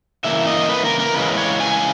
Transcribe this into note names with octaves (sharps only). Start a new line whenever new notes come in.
C#3 E3 A#3 E4 E5
D#5
B4
A#4
A#4
C#3 E3 G#3 C#4 E4 B4
C#5
G#5